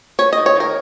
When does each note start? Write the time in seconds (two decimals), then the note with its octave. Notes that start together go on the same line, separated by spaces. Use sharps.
0.19 C#4 C#5
0.33 D#5
0.38 D#3
0.46 C#5
0.56 D#3 A#4